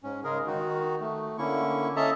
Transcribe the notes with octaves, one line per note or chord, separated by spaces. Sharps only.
G#2 C#4
C#3 G#3 G#4 A#4
D#3 D#4 F#4
A3
D3 A#3 C#4 E4 C#6
C#4 A4 D#5 E5 A5 A#5